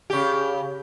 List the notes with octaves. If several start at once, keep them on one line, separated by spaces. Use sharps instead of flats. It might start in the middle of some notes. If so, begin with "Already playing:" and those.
C#3 G4